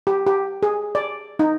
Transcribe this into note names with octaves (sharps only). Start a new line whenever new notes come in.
G4
G4
G#4
D5
D#4